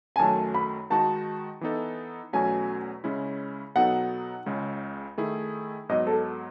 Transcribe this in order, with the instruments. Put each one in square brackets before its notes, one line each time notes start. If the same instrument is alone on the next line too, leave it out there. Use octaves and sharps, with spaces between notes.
[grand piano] G#5
[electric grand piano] F#2 D#3 F#3 A3 [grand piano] A5
[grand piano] B5
[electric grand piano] D#3 G#3 D#4 F#4 [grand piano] A5
[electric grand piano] E3 B3 D#4 A4
[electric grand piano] E2 B2 F#3 A3 C#4 [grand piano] G#5
[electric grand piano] C#3 G#3 C#4 E4
[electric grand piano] B2 F#3 B3 D#4 A4 [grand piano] F#5
[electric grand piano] C#2 C#3 G#3
D#3 A3 E4 G#4
[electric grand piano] G#2 F#3 B3 [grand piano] D#5
[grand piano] A4